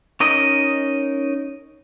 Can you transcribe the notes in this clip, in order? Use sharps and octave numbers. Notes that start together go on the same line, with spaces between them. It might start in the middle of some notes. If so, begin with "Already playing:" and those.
C#4 D#4 A#4 D#5